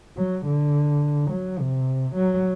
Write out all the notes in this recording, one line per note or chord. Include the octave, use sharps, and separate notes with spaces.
F#3
D3
F#3
C3
F#3